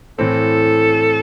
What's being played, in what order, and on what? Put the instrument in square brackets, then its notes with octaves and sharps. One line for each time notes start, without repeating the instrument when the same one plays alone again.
[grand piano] A2 E3 C4 [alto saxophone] A4